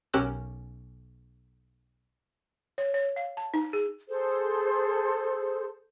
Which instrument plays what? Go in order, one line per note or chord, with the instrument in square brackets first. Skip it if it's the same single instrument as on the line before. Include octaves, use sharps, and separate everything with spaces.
[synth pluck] B1 C#4 G4 A#4 E6 F#6
[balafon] C#5
C#5
F5
A5
D#4
G#4
[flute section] G#4 A4 C5